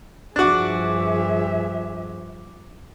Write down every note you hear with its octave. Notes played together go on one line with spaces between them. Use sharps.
G2 F3 D4 F#4 G#4 E5 D6 F#6